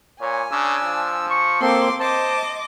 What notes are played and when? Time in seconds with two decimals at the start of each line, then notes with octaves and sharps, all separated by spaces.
0.21 A#2 C#5 G#5
0.52 C#3 D4 E6
0.84 F3
1.30 C#6
1.62 A#3 C4 A4 C6 D6
2.00 C5 D#5 A5 D6